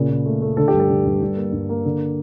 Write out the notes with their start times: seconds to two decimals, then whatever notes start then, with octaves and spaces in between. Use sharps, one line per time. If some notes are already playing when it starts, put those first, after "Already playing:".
Already playing: A#2 C#3
0.10 A#2
0.25 A3
0.42 A3
0.57 D3 A4
0.68 G2 G4
0.80 A4
0.90 D3
1.06 G2
1.22 G2
1.36 A#3
1.52 G2
1.69 A#3
1.85 D3